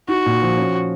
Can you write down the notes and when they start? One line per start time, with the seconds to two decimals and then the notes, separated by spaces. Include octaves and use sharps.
0.08 D#4 F#4
0.26 A#2
0.42 F3
0.58 C#4